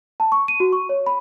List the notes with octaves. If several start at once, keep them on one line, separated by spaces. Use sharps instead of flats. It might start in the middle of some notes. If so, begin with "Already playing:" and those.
A5
C#6
D#7
F#4
C#6
C#5
B5